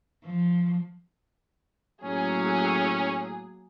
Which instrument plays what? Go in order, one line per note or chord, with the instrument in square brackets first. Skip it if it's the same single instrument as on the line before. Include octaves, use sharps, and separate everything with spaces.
[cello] F3
[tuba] A2 [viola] F#3 A#3 [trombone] C#4 [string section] G#4